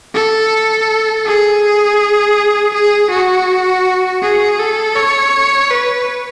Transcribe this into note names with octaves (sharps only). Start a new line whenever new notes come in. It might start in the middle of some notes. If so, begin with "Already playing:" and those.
A4
G#4
G#4
F#4
G#4
A4
C#5
B4